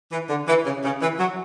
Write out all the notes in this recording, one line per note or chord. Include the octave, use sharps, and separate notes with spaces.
E3
D3
E3
C#3
C#3
E3
F#3